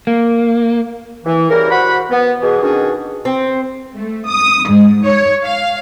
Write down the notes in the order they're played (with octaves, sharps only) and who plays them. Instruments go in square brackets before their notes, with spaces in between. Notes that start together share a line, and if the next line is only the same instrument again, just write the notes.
[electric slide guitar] A#3
[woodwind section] E3
C#3 G3 E4 A#4
F#4 C5 F#5 B5
B3
B2 E3 G#4
B2 D#3 C#4 D4 F#4 G#4
[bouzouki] C4
[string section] A3
D#6
G#2
C#5
F5